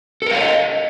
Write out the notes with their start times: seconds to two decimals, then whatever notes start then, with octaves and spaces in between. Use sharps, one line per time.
0.22 A4
0.26 A#4
0.31 F5
0.36 C#5
0.40 D#5